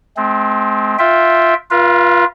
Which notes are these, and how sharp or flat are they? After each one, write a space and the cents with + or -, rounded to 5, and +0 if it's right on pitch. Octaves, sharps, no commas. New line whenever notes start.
G#3 +45 C4 +0
F4 +5 E5 +0 G5 +0
F4 +5 B4 -40 F5 -40